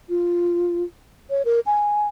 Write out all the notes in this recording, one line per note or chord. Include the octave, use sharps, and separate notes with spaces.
F4
C#5
A#4
G#5